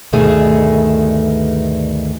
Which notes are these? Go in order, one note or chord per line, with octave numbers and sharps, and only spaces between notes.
D2 G2 B2 D#3 A3 G#4